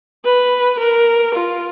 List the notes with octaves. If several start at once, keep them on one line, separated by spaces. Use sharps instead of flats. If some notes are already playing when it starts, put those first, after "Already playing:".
B4
A#4
F4